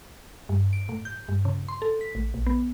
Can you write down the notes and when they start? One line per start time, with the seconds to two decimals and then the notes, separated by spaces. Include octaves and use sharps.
0.49 G2
0.73 D7
0.89 A2
1.05 G6
1.29 G2
1.45 C#3
1.68 C6
1.82 A4
2.01 B6
2.15 A1
2.34 A#1
2.46 B3